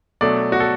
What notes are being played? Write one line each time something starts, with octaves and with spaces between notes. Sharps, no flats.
B2 F#3 A3 D4 D5
F#4
A4